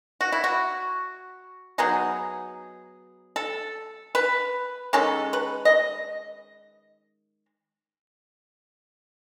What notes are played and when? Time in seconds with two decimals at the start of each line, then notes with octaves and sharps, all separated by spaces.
0.21 F#4
0.32 E4
0.44 F#4
1.78 F#3 B3 D#4 G#4
3.36 A4
4.15 B4
4.93 D#3 G#3 C#4 A4
5.33 B4
5.65 D#5